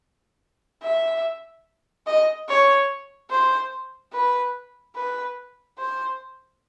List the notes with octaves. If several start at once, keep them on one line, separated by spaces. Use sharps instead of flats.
E5
D#5
C#5
C5
B4
B4
C5